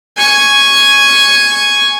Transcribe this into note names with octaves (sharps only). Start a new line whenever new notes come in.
G#5 C#6